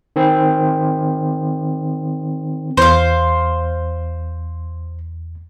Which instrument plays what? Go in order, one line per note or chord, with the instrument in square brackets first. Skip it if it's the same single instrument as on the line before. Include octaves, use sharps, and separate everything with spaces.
[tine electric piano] D#3 C4
[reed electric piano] E2 [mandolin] C5 F5